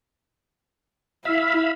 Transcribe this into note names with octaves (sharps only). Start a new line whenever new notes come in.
E4 E5 F5 B5